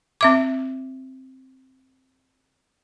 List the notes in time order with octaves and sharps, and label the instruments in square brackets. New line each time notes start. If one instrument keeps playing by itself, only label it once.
[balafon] C4 E5 D6